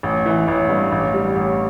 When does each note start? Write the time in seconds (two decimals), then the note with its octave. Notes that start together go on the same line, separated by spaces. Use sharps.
0.03 A1
0.26 E3
0.48 A1
0.69 G2
0.92 A1
1.14 G3
1.36 A1